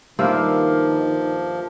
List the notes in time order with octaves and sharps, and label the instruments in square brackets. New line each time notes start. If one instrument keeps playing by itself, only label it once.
[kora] G2 A#3 C5 [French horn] D#3 [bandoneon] F3 [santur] E5 F5 D6